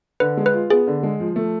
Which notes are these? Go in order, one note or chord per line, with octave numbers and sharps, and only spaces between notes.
D3 B4
G#3
B4
F4
B3 G#4
D3
G#3
F3
A3